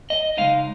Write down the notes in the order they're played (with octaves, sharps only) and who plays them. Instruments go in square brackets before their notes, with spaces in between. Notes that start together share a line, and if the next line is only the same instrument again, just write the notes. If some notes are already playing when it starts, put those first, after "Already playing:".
[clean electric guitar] D#5
C#2 C#3 G#3 D#4 F5